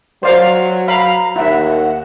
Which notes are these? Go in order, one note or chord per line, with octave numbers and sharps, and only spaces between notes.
F#3 C5 D5 F5
F5 A#5 B5
D#2 E4 E5 F#5